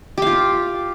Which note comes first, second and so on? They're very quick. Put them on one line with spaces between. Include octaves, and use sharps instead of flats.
G4 F5 F4